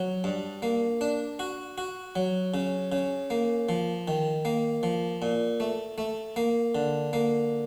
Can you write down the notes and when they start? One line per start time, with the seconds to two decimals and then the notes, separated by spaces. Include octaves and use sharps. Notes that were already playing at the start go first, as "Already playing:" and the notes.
Already playing: F#3
0.24 G2
0.62 A#3
1.01 D4
1.39 F#4
1.78 F#4
2.16 F#3
2.54 C#3
2.92 C#3
3.30 A#3
3.69 F3
4.08 D#3
4.45 A#3
4.83 F3
5.22 A#2
5.60 A3
5.98 A3
6.36 A#3
6.75 D3
7.13 A#3